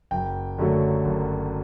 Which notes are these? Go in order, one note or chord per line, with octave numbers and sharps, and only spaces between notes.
F#1 G5
F#2 D3 F#3 A3
F#1